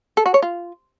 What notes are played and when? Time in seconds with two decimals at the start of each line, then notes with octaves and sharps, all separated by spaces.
0.17 A4
0.26 F#4
0.34 C#5
0.42 F4